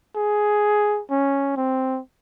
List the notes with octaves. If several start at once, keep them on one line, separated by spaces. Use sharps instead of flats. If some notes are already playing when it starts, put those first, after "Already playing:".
G#4
C#4
C4